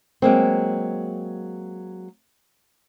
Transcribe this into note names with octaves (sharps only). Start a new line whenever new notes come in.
F#3 G#3 A#3 C4